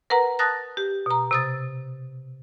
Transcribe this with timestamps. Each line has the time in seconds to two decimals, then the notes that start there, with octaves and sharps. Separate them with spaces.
0.10 A#4 B4 F#5 A#5
0.39 A5 D#6 F#6 A6 A#6
0.77 G4
1.06 B2 A#5
1.31 C3 D#6 A6